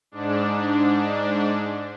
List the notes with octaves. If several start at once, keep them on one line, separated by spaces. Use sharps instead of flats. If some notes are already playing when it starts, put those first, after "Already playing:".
G#2 D4